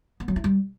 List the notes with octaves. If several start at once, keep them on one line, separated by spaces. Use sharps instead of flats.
B3
F#3
E4
G3